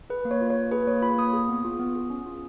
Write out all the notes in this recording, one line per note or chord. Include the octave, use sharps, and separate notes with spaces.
G#4 B4
A#3
C#5
F4
C#5
A#3
G#4 B4
A#3 C#5
F4 B5
A#3 D#6
G#4
B3
F4
B3
G#4
C#4
F4